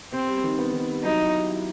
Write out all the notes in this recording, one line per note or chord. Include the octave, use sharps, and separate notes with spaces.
C3 C4
G3
D#3
B3
D#3
G3
F#3 D#4
E4
G4
E4